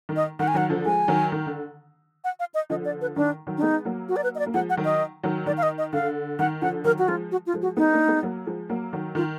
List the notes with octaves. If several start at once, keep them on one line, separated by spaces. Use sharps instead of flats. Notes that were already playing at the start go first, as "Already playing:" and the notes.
D#3
D#5
D#3 F#5
G#5
D#3 F#3 F#5
D3 F3
F3 G#3 G#5
D#3 F#3
D#3
D3
F#5
F5
D#5
D3 F3 D#5
D5
B4
D#3 D4
D#3 F#3
D4
G#3 B3 D#4
F#3 A#3
F#4
D5
B4
D#5
D5
A#3
F3 G#3 F#5
F#5
D#3 F#3
D#5
D#3 F#3
D#3 D5
F5
D#5
D#5
D3 F5
D#3 F#5
D3 F3 F#5
D#3 F#3 A#4
F#4
F3 G#3 F4
F#4
F4
F3 G#3
F#4
G#3 B3 D#4
A#3 D4
G#3 B3
F#3 A#3
F3 G#3
F#3 A#3
D#3 F#3
D#3 F4